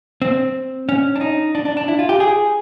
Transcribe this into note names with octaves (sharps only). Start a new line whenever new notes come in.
C4
C#4
D4
D#4
D4
D4
D4
E4
F4
G4
G#4